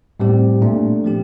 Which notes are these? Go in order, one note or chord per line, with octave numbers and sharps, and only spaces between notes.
A2 G3 C4 G4
A#2 A3 D4
F3 C4 G4